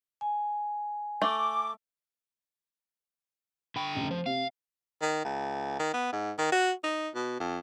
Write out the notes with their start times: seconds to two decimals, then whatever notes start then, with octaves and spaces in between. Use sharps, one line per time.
0.21 G#5
1.22 A3 D6
3.76 D3 G5 B5 C#6
3.95 F1 C#3
4.11 F3 C5
4.26 C3 F5
5.01 D#3
5.25 C#2
5.79 D#3
5.94 B3
6.12 G#2
6.38 D#3
6.52 F#4
6.84 D#4
7.15 B2
7.40 F2